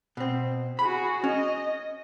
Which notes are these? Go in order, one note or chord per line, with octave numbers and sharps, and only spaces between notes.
B2 C4
F#4 G#4 B5
C#4 D#5